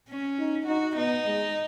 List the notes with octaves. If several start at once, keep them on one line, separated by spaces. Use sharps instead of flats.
C#4
D#4
D#4 F#4
B3 D#4
G#3